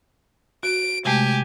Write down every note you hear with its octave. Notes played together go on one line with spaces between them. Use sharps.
F#4 D7
C3 G#3 A3 G4 G#5